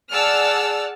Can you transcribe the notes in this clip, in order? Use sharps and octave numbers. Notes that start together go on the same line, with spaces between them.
G#4 D5 F#5 A5 E6 F6